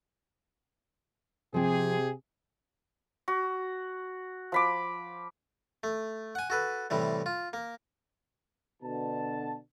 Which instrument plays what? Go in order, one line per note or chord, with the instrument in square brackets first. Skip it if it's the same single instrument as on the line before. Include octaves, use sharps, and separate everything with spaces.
[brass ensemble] C3 G4 G#4 [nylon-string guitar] F3 C4
[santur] F#4
F3 B5 D6
[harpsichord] A3
F#5 G#5
F#4 A4 B4
A2 C3 E3 G3
F4
A#3
[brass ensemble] B2 D3 A5